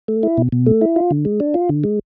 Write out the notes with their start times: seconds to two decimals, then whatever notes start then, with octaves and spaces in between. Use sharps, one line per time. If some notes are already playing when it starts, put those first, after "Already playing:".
0.08 A3
0.23 E4
0.37 B2
0.52 B2
0.66 A3
0.81 E4
0.96 F4
1.11 D3
1.25 G#3
1.40 D4
1.54 F4
1.69 D3
1.84 G#3